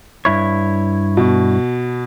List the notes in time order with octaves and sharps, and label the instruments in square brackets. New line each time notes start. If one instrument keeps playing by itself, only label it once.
[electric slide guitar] G2 E4 C#5
[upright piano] B2